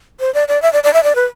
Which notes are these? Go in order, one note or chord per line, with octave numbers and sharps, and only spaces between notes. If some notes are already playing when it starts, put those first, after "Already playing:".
C5
D5
D5
E5
D5
D5
E5
D5
B4